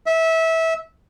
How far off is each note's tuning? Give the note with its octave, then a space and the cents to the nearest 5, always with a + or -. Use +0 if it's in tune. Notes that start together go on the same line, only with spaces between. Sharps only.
E5 -20